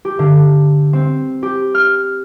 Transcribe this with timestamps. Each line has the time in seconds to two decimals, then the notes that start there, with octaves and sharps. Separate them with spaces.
0.05 G4
0.19 D3
0.93 C4
1.43 G4
1.74 F6